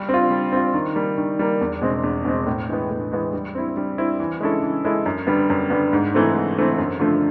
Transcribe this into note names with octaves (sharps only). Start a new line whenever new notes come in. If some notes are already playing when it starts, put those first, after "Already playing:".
Already playing: G3
C4
F4
G3
C4 F4
D#3
G3 A#3
D#3
G3 A#3
E2
B2 G#3 C4
E2
B2 G#3 C4
A2
E3 G#3 B3
A2
E3 G#3 B3
G3
C4 E4
G3
C4 E4
E3
G#3 C#4 E4 A4
E3
G#3 C#4 E4 A4
F#2
D3 G3 B3
F#2
D3 G3 B3
G#2
E3 A3 C4
G#2
E3 A3 C4
F#2
D3 F3 A3